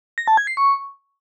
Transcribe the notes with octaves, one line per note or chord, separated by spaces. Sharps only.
A#6
A5
G#6
C7
C#6